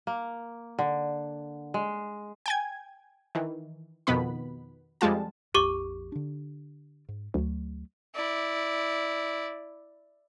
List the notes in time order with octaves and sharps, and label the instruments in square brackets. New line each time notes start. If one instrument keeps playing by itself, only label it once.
[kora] A#3
D3
G#3
[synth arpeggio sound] G5 G#5 G#6
D#3 E3
F2 B2 D#3 B3 B4 B5
F2 G3 G#3 F4 A5
[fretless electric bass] A#1 F2 [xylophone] G4 C#6 D6
[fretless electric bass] D3 D4
G#2
[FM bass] D2 [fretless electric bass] F#3 A3
[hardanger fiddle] E4 D5